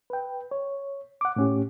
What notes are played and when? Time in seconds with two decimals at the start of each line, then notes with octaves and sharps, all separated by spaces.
0.10 B4 G5
0.51 C#5
1.21 F#5 D6
1.36 A2 C#4 G4